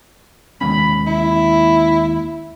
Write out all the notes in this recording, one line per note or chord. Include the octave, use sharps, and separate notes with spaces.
D#2 G#3 C#4 B5
E4